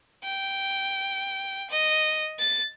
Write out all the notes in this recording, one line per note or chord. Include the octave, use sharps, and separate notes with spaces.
G5
D#5
A6